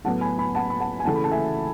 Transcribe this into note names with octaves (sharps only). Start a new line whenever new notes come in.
A2 F#3 B3 F#5 A5
G#5 B5
G#5 B5
F#5 A5
B5
F#5 A5
G#5
C#3 E3 A3 F#5 A5
B5
A5
E5 G#5